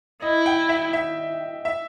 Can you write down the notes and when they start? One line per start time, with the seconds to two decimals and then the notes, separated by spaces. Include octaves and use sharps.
0.22 E4 D#5
0.46 G5
0.69 E5
0.93 E5
1.65 E5